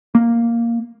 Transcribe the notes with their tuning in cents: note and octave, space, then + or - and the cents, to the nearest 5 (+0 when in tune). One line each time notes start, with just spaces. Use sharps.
A#3 +0